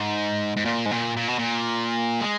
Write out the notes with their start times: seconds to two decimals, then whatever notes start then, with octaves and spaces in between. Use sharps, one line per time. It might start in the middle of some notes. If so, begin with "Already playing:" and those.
Already playing: G#2
0.57 G#2
0.65 A#2
0.86 G#2
0.91 A#2
1.17 A#2
1.28 B2
1.39 A#2
2.21 G#3